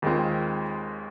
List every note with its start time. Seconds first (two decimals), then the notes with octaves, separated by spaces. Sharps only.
0.02 D#2 D#3 G#3 C4 F4